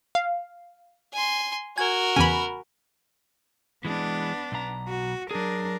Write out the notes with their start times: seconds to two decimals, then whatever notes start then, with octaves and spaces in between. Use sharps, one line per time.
0.15 F5
1.13 G#5 C6
1.78 F#4 A#4 G#5
2.16 E2 C#3 G#5 B5
3.85 E3 G#3 B3 D4
4.52 B1 A#5
4.88 F#4
5.31 F#3 D4 G#4 A#4